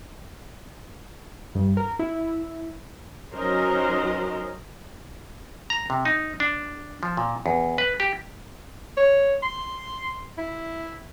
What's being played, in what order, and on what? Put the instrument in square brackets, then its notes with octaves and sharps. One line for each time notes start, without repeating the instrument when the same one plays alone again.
[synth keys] G2
A#4
E4
[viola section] F#3 C#4 D#4 A#4 C5 D#5
[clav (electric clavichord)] A#5
C3
D#4
D4
F3
A#2
E2
B4
G4
[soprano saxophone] C#5
C6
E4